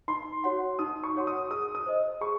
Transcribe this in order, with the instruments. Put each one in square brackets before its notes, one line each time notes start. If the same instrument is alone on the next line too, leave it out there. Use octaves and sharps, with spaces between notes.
[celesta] D#4 [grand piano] C6
[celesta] F#4 C#5 F#5 C6
[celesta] D#4 [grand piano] D#6
[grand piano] C#6
[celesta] F#4 C#5 F#5 C6
[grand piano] D#6
[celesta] G#4 [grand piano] D#6
[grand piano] D#6
[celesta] C5 D#5
[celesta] G#4 [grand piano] C#6